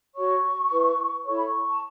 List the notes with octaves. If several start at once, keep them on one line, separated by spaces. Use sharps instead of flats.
F#4 C#5 C#6
E4 B4
E4 A4 C#5 C#6
B5
C#6
A5